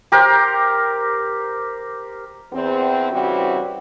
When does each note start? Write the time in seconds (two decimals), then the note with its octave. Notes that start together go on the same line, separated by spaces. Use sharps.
0.12 G4 A#4 C5
2.53 E2 C4
3.12 C#3 E3 G3 C4 E4 F#4